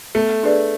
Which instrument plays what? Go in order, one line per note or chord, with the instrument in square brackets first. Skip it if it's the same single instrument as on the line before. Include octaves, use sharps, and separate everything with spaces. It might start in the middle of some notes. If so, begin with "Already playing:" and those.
[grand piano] A3 [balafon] B3
[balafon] D4 G#4 B4 D5